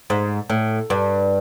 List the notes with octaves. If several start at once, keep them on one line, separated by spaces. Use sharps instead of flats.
G#2
A2
G2